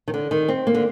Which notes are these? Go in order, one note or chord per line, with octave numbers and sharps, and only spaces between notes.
D#3
D3
D#3
C4
A#3
D3